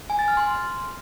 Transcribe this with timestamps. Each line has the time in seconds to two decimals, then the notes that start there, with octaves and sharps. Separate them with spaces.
0.10 G#5
0.19 A6
0.28 F6
0.37 C6